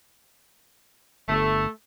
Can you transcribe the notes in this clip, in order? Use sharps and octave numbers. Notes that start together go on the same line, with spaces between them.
G1 A3